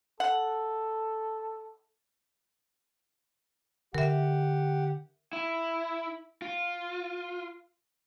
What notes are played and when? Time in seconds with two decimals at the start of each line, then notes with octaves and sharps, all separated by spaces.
0.20 A4 F#5
3.95 D3 G4 A#4 E5 F#5
5.33 E4
6.42 F4